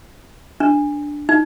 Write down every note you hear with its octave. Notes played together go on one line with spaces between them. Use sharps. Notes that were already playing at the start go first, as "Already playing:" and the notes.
D4
D#4